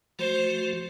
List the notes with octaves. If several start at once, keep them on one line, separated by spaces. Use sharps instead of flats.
F3 A3 F#4 C5